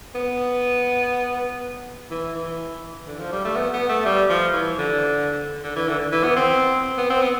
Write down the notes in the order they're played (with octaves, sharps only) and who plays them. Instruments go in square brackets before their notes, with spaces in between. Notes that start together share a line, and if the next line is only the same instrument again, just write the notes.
[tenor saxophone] B3
E3
E3
D3
F3
G3
A3
B3
B3
A3
G3
F3
E3
D3
D3
E3
D3
E3
B3
C4
B3
C4
B3